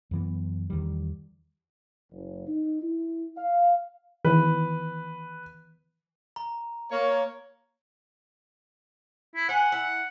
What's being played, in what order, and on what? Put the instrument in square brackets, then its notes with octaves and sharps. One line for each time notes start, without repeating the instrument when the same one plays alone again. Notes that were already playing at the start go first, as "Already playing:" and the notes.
[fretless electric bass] F#2 E3 B3
E2 D#3 G3
[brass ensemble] F#1
D#4
E4
F5
[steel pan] D#3 E3 [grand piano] B4
[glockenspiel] A#5
[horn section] A#3 C#5
[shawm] E4
[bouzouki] C5 G#5 [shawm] F#5
[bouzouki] E4